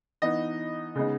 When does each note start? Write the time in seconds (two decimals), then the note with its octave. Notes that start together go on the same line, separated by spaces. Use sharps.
0.22 E3 B3 D#4 D#5
0.96 C#3 G#3 B3 D#4